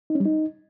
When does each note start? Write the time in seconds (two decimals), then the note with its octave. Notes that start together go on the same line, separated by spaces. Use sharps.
0.10 D#4
0.15 C#4
0.20 G3
0.25 D#4